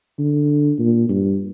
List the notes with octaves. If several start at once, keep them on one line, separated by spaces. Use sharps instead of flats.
D3
A#2
G2